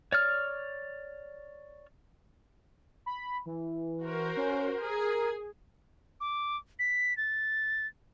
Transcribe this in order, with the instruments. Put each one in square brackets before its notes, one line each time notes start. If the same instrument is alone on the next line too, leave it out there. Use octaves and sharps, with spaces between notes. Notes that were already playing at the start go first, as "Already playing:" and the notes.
[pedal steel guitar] C#5 D5 F6
[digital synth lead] B5
E3
[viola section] F#4 A#4 C5
[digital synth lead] C#4
[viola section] G#4 [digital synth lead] A#4
[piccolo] D6
B6
A6